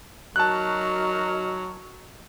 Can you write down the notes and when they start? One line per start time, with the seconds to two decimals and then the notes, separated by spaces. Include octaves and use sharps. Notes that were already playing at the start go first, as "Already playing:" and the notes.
0.36 F#3 D#4 F#4 A#4 A5 F#6